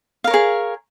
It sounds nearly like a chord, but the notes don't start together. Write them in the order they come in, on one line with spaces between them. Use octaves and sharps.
F5 A#4 C#5 G#4